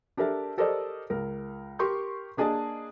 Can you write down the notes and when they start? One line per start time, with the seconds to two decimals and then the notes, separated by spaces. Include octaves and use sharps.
0.17 D4 G4 A4 A#4 E5 A5
0.57 G4 A4 A#4 C5 D5 D#5
1.10 C#2 A#4
1.79 G4 A#4 C6 C#6 G6
2.37 A#3 D4 G#4 D#5 A5